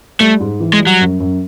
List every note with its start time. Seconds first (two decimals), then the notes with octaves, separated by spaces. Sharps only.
0.20 G3 A3
0.40 G#2
0.60 E3
0.73 G#3
0.79 G3
0.87 F#3
1.00 F#2
1.20 F#2